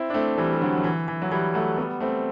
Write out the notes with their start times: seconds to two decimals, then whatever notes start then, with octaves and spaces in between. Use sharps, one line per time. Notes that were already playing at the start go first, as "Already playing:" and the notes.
Already playing: C4 E4
0.10 D4
0.14 A3 C4
0.38 E3 G3
0.53 G3
0.61 D3 F#3
0.77 F#3
0.84 E3
1.08 E3
1.22 F#3
1.32 E3 G3
1.54 F#3 A3
1.77 G3 B3
2.00 A3 C4